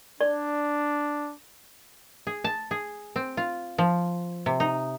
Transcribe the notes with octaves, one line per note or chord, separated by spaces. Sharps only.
D4 D5
G#4
A5
G#4
C4
F4
F3
C3
D#4